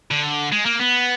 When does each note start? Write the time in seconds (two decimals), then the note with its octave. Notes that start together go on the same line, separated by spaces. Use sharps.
0.11 D3
0.52 G#3
0.66 A#3
0.80 B3